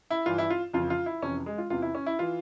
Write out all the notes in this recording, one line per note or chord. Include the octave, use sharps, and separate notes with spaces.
E4
G2 E3 F4
E4
F4
F2 C#3 E3 F4
F4
E4
F2 C3 E3 C#4
G#3
F4
E2 C3 E3 F4
E4
C#4
E4
E3 F4